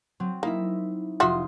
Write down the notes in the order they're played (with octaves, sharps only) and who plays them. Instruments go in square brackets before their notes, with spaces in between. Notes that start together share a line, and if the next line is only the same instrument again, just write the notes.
[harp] F#3 C4
[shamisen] A#3 [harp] D#4 E4 E5
[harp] F1 C6 D#6 [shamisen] F4 F#4 E5